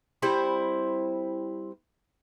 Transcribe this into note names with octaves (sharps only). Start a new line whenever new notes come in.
G3 C4 E4 C5